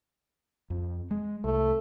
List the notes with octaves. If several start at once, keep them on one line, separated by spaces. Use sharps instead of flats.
F2
G#3
C2 A3